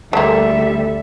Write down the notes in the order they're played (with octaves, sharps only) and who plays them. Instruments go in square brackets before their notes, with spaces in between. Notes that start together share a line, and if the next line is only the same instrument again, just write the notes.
[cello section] D2 G3 A4 [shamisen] G#3 A#3 [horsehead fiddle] E5